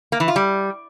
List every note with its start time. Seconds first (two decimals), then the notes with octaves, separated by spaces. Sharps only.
0.12 A#3
0.20 E3
0.28 F4
0.36 G3